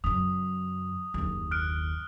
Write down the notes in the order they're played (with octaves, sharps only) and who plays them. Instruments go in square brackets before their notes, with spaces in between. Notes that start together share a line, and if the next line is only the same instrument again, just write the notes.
[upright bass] F#2 C#3 [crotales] D#6
[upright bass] F#1 D#2
[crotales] F6 F#6 D7